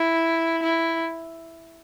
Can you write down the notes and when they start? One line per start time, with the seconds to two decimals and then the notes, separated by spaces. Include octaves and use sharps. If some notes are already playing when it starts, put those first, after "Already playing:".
Already playing: E4
0.63 E4